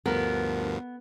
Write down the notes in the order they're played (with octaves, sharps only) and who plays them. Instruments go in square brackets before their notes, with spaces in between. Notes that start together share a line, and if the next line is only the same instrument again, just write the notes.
[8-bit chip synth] D2 G2 F3 [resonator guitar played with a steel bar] B3 [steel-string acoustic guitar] A#4